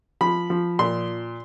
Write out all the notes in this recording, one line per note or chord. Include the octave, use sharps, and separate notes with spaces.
F3 B5
F3
A#2 C6